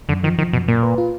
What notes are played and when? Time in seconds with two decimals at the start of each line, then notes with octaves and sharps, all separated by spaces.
0.09 F#2 D3
0.23 D#3 F3
0.38 D#3 F3
0.53 F#2 B2
0.68 A#2 A#3
0.83 B4
0.98 F4